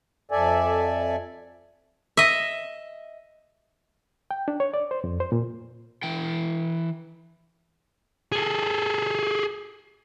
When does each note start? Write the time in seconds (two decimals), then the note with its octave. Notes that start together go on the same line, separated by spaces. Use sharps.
0.31 F2 A4 D5 E5 G#5
2.17 D#5 E5
4.31 G5
4.48 D4
4.60 C#5
4.74 D5
4.91 C5
5.04 F2
5.20 C5
5.32 A#2
6.03 E3 G5
8.32 G#4 A4